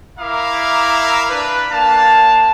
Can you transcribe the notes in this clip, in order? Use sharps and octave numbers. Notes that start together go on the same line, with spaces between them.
E4 A#4 E5 F5 A#5 D6
D4 B4
A#3 D4 F5 A5